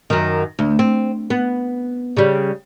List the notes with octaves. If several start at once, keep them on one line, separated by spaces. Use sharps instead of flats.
F#2 D#3
D2
C4
B3
C#3 G3